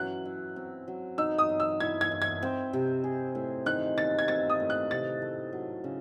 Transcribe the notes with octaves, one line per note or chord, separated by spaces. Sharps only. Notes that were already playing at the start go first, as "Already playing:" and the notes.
Already playing: E3 F#3 C#4 F#6
E4
C4
F#3
D#4 E6
D#6
F#3
E6
E4 G#6
G#6
E4
G#6
C4
C3
G#4
A2
D#3 F#6
D#3 A6
G#6
C4 A6
D#6
A2
F#6
C3 A6
A3
F#3
C#3